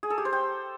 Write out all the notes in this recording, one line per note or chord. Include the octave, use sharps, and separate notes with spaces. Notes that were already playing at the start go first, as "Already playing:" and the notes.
G#4
A4
G4
C5
G5